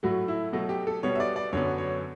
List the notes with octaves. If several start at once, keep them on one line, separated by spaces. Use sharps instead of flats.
A2 F#3 A3 F#4
E4
B2 F#3 A3 F#4
G4
A4
B2 G3 B3 C#5
E5
D5
D5
F#2 D3 F#3 B3 C#5
C#5